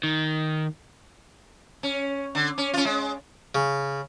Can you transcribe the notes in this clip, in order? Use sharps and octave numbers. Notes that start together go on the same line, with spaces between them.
D#3
C#4
D3
C#4
C#4 F4
G#3
C#3